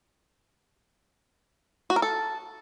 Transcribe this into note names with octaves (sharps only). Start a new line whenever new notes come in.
F#4
A#4
A4